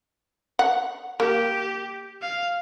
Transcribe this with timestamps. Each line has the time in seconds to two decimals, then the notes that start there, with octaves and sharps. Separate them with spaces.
0.59 F#5
1.20 A#3 G4
2.22 F5